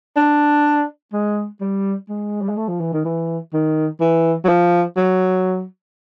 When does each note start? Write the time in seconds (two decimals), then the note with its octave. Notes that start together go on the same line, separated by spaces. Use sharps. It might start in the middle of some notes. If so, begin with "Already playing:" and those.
0.16 D4
1.13 G#3
1.61 G3
2.09 G#3
2.42 G3
2.49 G#3
2.57 A3
2.69 F3
2.80 E3
2.93 D#3
3.05 E3
3.54 D#3
4.01 E3
4.45 F#3
4.49 F3
4.97 F#3